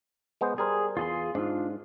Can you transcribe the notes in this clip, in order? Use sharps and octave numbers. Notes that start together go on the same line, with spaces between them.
G#3 B3 C5
G3 G#4 A#4 C5
E2 F4 G#4 C6
G#2 D4 F4